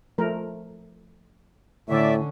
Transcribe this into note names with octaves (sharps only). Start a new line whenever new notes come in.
F3 A3 A#4
A2 D3 C#4 D5 E5